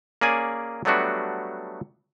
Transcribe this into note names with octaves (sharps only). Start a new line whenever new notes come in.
A#3 C#4 G#4 D5 G#5
F#3 G3 A3 B3 D4 F#4